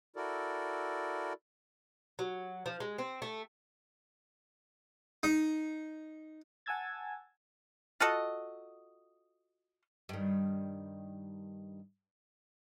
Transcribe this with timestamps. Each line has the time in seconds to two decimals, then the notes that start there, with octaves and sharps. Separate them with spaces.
0.16 E4 F#4 A4 A#4 D5
2.19 F#3
2.66 F3
2.80 G#3
2.98 C4
3.22 A3
5.23 D#4
6.66 F#5 G#5 A5 E6 G#6 A6
8.00 F4 F#4 A4 D#5
10.09 G2 D#3